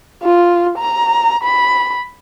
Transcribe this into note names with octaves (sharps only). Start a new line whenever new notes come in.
F4
A#5
B5